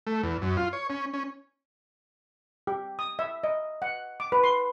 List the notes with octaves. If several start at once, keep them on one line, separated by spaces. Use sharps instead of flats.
A3
E2
F#2
F4
C#5
C#4
C#4
G4
D#6
E5
D#5
F#5
D6
B4
C6